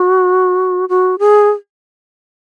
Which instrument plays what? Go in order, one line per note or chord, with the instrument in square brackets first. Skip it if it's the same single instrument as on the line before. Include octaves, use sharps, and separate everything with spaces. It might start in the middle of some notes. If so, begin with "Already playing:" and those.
Already playing: [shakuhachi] F#4
F#4
G#4